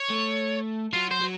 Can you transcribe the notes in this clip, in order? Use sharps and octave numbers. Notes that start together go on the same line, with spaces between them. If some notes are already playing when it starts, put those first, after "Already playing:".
Already playing: C#5
A3
F#3 F4
C5
F#3